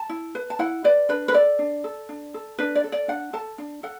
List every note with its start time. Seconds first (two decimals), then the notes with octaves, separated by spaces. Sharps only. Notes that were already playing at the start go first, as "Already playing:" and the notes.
Already playing: A5
0.09 E4
0.35 B4
0.50 A5
0.59 E4 F#5
0.84 B4 D5
1.09 D4 B4
1.28 B4
1.34 A4 D5
1.59 D4
1.84 A4
2.09 D4
2.34 A4
2.58 D4 B4
2.75 D5
2.84 A4
2.92 D5
3.08 D4 F#5
3.33 A4 A5
3.58 D4
3.83 A4 F#5